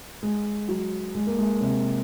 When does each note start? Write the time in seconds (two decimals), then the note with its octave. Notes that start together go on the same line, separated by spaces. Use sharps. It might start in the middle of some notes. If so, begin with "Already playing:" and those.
0.23 G#3
0.68 F#3
1.15 G#3
1.27 A#3
1.39 G#3
1.61 C3